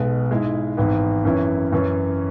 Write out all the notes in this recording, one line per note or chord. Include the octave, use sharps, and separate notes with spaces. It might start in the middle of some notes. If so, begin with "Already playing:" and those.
Already playing: B1 B2 G#3 B3
G#2 G#3 E4
G#1 G#2 E3 B3
F#2 E3 C#4 E4
F#2 E3 C#4